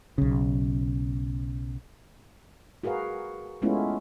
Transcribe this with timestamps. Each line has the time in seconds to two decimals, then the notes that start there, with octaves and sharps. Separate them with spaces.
0.18 B1 C#3
2.84 F#4 G#4 A#4 B4 F5
3.62 G#3 A3 B3 C#4 E4 F4